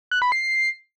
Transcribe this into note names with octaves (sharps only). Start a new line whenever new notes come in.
F#6
B5
C7